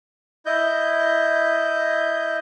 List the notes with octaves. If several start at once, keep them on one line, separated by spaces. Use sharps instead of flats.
E4 D#5 G6